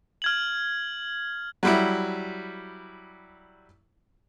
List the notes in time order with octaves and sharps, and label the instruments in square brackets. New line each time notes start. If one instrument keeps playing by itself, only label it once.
[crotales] F6 G#6 F#7
[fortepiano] F#3 G3 E4